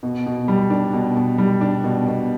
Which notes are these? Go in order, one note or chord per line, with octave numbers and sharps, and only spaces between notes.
B2
B2
G3
D4
B2
B2
G3
D4
B2
B2